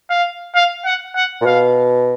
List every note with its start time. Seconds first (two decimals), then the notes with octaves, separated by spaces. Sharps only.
0.10 F5
0.55 F5
0.85 F#5
1.15 F#5
1.41 A#2
1.45 B2 F5